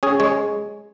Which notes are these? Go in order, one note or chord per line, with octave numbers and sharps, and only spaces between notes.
C#4 G#4
G#3 C#5